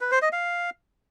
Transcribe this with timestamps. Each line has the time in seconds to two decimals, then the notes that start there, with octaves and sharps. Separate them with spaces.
0.01 B4
0.11 C5
0.22 D#5
0.33 F5